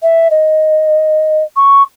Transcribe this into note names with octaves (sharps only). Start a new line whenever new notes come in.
E5
D#5
C#6